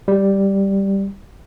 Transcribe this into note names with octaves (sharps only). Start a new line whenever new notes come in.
G3